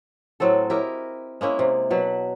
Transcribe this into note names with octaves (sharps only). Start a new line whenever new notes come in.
A2 F#3 C4 A4
E4 G4 A#4 D#5
G#3 A#3 C#4 E4
C3
B2 F#3 B4